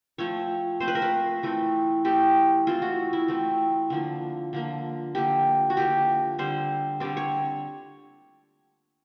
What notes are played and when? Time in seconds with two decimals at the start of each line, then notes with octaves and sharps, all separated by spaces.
0.18 F3 A3 C4 C#5
0.80 F3 A3 C4 C5
0.88 B4
0.95 A#4
1.02 B4
1.43 E3 A3 C4
2.05 E3 A3 C4 G4
2.67 E3 A3 C4 F4
2.82 F#4
3.13 E4
3.28 E3 A3 C4
3.90 D3 F3 A#3
4.53 D3 F3 A#3
5.15 D3 F3 A#3 G4
5.70 F#4
5.77 D3 F3 A#3 G4
6.39 D3 G3 C4 C5
7.00 D3 G3 C4 D5
7.17 C#5